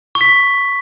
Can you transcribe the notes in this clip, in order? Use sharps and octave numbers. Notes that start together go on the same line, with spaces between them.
C#6
B6